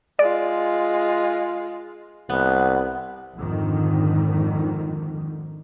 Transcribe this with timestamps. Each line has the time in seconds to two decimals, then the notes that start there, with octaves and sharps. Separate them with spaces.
0.19 G#3 F4 D5
2.29 C2 B3
3.38 F2 G#2 D3 D#3